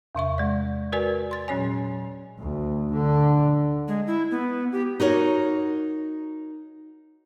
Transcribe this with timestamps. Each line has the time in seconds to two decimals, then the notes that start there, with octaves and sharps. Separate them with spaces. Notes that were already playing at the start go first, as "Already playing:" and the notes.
0.15 E2 C3 E5 C#6
0.38 G#3 D5
0.92 F#4 A#4 B4 D5 G#5
1.31 C6 A6
1.48 A#2 F#3 C#4 C#5 G#5
2.40 D2
2.92 D3
3.88 G#3
4.07 E4
4.31 B3
4.72 G4
5.00 D#4 F#4 A#4 C#5